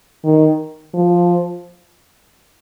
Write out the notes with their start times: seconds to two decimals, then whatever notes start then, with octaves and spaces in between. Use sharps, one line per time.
0.24 D#3
0.94 F3